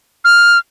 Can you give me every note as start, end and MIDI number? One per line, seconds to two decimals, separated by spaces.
0.25 0.58 89